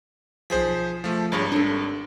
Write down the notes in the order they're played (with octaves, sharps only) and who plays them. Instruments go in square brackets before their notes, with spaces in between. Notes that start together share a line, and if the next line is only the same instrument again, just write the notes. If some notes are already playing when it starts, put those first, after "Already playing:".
[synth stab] B1 B6 [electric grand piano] F3 G#4 C5
[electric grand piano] F3 A3
[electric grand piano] G#1 G2 [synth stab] G#4 C#5 D6
[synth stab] D4 A4